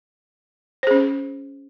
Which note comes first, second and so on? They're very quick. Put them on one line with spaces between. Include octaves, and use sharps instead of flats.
C5 G#4 C#4